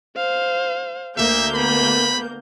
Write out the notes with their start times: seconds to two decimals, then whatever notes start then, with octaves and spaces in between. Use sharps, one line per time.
0.17 C5 F5
1.18 D2 A#3 E5 G6
1.54 B3 B5